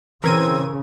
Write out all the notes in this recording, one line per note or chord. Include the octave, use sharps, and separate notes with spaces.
C#3 E3 C4 A#4 G#6 D#7